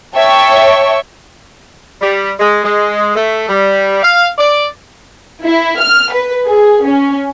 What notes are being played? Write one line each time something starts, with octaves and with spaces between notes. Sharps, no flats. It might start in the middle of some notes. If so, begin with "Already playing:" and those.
C#5 E5 G5 A5 C#6
G3
G#3
G#3
A3
G3
F5
D5
E4
F6
B4
G#4
C#4